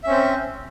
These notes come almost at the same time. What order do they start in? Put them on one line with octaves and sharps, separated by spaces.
E5 C#4 C4